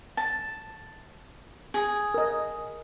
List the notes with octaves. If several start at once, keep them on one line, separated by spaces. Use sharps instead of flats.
A5
G#4
A#4 D#5